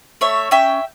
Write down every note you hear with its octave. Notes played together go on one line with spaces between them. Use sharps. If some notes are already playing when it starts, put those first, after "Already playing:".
A3 C#5 E5
C#4 E5 G5